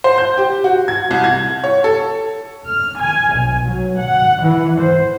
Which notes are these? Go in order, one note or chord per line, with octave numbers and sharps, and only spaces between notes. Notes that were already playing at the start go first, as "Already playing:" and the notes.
C5
G6
G4
F#4
G#6
C2
G#6
C#5
A4
F6
G#5
B1
F#3
F#5
E3
C5